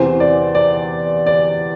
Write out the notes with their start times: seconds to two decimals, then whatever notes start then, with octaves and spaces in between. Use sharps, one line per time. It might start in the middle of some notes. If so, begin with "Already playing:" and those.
Already playing: E2 C3 E3 C5
0.20 D5
0.55 D5
1.26 D5